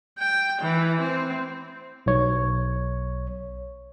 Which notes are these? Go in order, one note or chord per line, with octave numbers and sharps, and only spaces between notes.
G5
E3
C4
B1 C#5